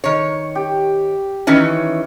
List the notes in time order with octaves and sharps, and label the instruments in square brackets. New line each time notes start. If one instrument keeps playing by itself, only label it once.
[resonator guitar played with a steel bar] D#3 C#5
[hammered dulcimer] G4
[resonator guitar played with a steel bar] D#3 E3 C#4